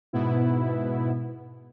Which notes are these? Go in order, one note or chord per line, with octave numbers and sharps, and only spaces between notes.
G#2 B2 B3 E4